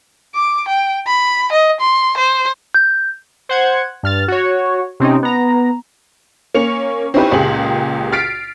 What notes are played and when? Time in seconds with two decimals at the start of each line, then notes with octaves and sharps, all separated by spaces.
0.35 D6
0.68 G5
1.07 B5
1.52 D#5
1.81 C6
2.17 C5
2.74 G6
3.49 C5 F#5 G#6
4.03 G2 F6 A6
4.28 F#4 C#5
5.00 C3 C4 C#4 D#4
5.23 B3 A#5
6.54 A#3 C#4 C#7 F7
7.14 C4 C#4 D#4 E4 G4 B4
7.31 C#2 A#2 G4 G#4 F#7
8.12 F6 A6 B6 C7 D7